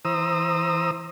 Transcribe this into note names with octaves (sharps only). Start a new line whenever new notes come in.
E3 C5 A#5 D#6 E6